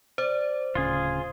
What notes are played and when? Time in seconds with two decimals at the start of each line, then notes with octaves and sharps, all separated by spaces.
0.18 C5 D5
0.75 D1 C#3 F4 G#4